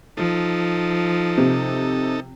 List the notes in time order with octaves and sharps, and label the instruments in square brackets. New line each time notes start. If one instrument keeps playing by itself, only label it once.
[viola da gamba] F3 [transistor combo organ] D#4 A4
[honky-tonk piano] C3